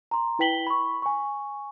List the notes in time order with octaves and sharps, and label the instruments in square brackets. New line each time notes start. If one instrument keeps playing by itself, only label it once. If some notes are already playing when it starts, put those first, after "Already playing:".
[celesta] A#5 C6
E4 B4 G5 B6 F#7 G7
B5 C#6
G#5 C#6